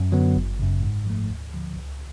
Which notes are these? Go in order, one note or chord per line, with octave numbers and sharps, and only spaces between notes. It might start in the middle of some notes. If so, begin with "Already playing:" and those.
Already playing: F#2
D3 F#3 B3
G1
F#2 C#3
G#2
F3 A3
D2
D3 F3
C#2